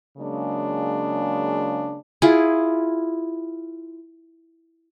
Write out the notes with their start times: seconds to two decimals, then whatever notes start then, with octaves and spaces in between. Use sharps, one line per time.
0.18 C#3 F#3 G#3 A#3 D4
2.22 E4 F4 G#4